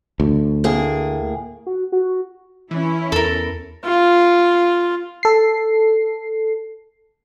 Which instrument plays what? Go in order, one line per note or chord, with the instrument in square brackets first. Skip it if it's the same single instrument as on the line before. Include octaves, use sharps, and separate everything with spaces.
[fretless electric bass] D2
[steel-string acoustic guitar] A2 A#3 G#4
[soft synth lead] F#4
F#4
[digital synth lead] E3 [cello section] C#4 E4
[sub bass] E2 [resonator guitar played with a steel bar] A4 A#4
[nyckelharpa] F4
[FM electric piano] A4 C7